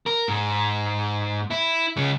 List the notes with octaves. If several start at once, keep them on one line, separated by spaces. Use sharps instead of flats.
A#4
G#2
E4
C#3 G#3